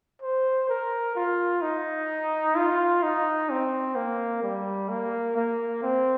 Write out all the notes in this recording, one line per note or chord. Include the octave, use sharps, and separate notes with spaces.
C5
A#4
F4
D#4
F4
D#4
C4
A#3
G3
A#3
A#3
C4